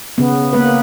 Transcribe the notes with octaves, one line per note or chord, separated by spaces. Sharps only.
C#3 B3
A#3 B3 B4